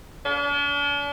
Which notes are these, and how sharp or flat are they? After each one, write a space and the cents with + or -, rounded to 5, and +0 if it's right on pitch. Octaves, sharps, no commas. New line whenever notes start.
D4 -45